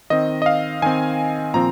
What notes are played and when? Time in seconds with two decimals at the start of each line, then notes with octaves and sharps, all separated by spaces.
0.10 D#3 C4 D#5
0.42 D#5
0.46 F5
0.82 D#3 C4 G#5
1.54 A#2 F3 C4 A#5